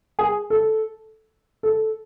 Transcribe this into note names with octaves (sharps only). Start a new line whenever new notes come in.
G#4
A4
A4